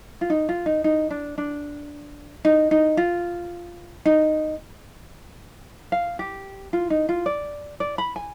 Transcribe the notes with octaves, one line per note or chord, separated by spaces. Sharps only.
F4
D#4
F4
D#4
D#4
D4
D4
D#4
D#4
F4
D#4
F5
G4
F4
D#4
F4
D5
D5
B5
G#5